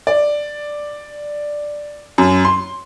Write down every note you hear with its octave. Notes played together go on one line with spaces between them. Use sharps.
D5
F#2
C6